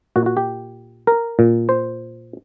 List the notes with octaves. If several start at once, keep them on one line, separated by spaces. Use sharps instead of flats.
A#2 F#4
F#4
G4
A#4
A#2
C5